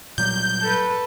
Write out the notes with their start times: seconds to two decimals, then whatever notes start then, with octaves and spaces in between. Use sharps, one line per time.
0.18 A#2 F#3 G3 G6
0.62 A4 B4